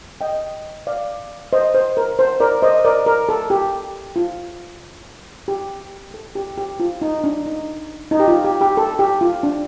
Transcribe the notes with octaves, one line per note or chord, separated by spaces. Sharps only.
D#5 G5
D5 F5
C5 D#5
C5
A#4
C5
A#4 D5
C5 D#5
A#4 D5
A#4
A4
G4
F4
G4
A4
G4
G4
F4
D#4
D4
D#4
D#4
G4
F4
G4
G4
A4
G4
F4
D4